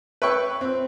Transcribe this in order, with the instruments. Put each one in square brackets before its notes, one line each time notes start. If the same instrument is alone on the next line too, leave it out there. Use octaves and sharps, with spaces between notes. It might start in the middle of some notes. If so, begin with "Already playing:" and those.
[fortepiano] B4 C#5 E5 G5 C#6
C4